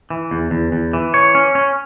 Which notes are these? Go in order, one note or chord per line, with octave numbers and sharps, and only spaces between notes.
E3
E2
E2
E2
E3
C#5
C#4
C#4